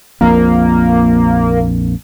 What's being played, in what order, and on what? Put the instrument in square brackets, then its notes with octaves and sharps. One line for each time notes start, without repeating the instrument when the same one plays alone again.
[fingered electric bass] A#1 F2 A#2 [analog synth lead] A#3